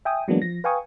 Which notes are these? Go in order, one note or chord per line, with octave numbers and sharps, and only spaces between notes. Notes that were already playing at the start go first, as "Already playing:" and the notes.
E5 G5 G#5 D#6
E3 F#3 G#3 A#3 B3 D4
F3 A#6
B4 F5 G5 G#5 C#6 D#6